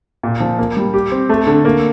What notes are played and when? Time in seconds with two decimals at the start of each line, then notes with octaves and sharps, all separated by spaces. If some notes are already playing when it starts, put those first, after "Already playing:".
0.23 A#2
0.40 F3
0.59 A#3
0.77 G3
0.93 G4
1.12 C4
1.29 A3
1.47 D3
1.65 A#3